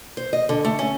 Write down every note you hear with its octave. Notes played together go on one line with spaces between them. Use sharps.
C5
D#5
D3
A3
C#4